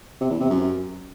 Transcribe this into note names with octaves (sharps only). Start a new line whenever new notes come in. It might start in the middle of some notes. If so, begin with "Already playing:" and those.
C3
E2
C3
F#2